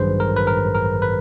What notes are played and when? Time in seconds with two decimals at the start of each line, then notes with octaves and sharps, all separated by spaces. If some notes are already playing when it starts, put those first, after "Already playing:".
Already playing: A1 G2 D#3 F#3 G#4 B4 C5
0.20 A#4
0.36 B4
0.47 A#4
0.75 A#4
1.02 B4